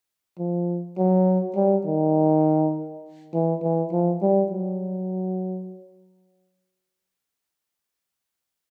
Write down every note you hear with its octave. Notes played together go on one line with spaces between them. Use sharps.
F3
F#3
G3
D#3
E3
E3
F3
G3
F#3